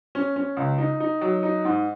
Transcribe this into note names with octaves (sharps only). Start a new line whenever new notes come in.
C#4
C#4
C#2
D#4
D#4
F#3
D#4
G#2